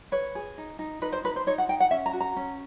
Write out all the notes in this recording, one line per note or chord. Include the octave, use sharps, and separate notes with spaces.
B4 C#5
G#4
D#4
D#4
D#4 B4
C5
D#4 B4
C5
D#4 C#5
F#5
D#4 G5
F#5
C#4 E5
A#5
F#4
A#5
C#4